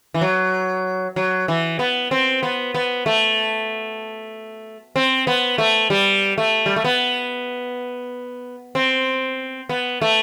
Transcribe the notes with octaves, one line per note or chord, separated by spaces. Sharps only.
E3
F#3
F#3
E3
B3
C4
B3
B3
A3
C4
B3
A3
G3
A3
G3
A3
B3
C4
B3
A3